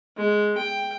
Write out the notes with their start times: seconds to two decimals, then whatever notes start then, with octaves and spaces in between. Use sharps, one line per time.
0.17 G#3
0.58 G5